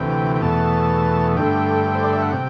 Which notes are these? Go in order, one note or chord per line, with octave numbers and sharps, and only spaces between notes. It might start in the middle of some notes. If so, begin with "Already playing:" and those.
Already playing: D2 C3 E3 G5
G5
E2 B2 A3 A5
G2 D3 A3 G5
C5
D5
E5
F#5
C3 G5